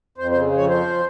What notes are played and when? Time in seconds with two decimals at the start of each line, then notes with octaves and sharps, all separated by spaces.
0.18 F2 C5
0.31 C#3 C5
0.52 F2 C#5
0.69 F3 C5